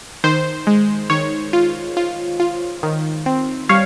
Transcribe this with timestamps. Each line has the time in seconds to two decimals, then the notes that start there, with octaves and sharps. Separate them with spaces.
0.24 D#3 C5
0.67 G#3
1.10 D#3 C#5
1.53 F4
1.97 F4
2.40 F4
2.83 D#3
3.26 C4
3.69 G3 C#5 F5